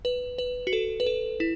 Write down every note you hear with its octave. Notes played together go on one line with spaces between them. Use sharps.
B4
B4
F#4
A4
B4
A4
E4